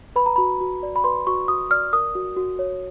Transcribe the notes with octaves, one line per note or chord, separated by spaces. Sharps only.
B4 B5
A#5
F#4 B5
F#4
D5
B5
B4 C6
F#4 C#6
F#4 D#6
D5 F6
A#4 D#6
F#4
F#4
C#5